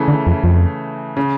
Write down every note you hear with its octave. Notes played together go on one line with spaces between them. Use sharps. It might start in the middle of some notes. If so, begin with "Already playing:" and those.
Already playing: C#3 E3 A3
D3
F2
F2
C#3